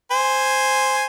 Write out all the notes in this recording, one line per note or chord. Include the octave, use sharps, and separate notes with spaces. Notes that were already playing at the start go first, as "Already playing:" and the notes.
C5 G#5